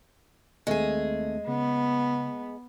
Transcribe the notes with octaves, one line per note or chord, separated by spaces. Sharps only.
D#2 G#3 A3 C4 G#4
C#3 B3